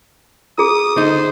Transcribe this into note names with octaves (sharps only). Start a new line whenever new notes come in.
F4 G#4 D#6
D3 D#4 C5